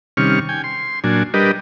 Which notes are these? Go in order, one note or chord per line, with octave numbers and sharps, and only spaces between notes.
C3 D#3 G3 C#4 C#6 F6
G5 G#5
C6
A#2 F#3 D4 G#5
G3 D4 G4 A#4 B4 D#5